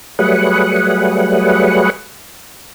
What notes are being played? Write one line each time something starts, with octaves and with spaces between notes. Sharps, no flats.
F#3 G3 A3 G#4 B4 F#5